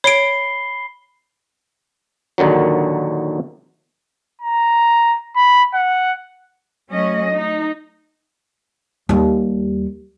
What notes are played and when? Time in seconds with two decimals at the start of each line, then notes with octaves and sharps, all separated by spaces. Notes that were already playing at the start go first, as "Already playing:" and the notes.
0.04 C#5 B5 C7 D7 G7
2.38 A#1 D#2 D3 D#3 F#3
4.41 A#5
5.36 B5
5.74 F#5
6.90 F#3 A3 C#4 D#5
7.34 D#4
9.09 D#2 G3